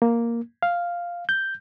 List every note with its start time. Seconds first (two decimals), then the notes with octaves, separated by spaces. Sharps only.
0.02 A#3
0.63 F5
1.29 G6